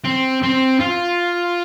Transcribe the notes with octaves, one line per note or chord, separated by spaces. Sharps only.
C4
C4
F4